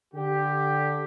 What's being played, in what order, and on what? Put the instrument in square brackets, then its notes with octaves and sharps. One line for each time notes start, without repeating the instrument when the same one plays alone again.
[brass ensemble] D3 G4